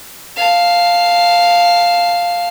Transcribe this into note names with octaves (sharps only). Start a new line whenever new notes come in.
F5 A5